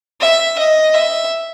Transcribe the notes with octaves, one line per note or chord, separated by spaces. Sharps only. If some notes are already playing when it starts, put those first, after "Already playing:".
E5
D#5
E5